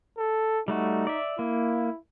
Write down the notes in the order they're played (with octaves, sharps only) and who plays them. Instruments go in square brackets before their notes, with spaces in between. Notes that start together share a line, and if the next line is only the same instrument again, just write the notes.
[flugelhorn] A4
[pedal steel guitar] G3 A3 F#4 [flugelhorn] D#4
[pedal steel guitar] D5 E5
[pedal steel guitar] A#3 [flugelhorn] E4